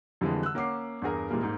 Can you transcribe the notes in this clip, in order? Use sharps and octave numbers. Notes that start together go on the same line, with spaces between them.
F2 D3 E3 G3 G#3
E6 F#6
A#3 C#4 F#5 D6 C7
E2 G2 G#4 A#4
A#2 E3 G3 G#3 A#3
G#2 A#3 D#4